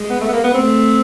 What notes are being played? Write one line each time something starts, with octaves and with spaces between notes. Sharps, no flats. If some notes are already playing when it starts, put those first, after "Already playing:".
Already playing: G#3
B3
A3
B3
A#3
B3
A3 C4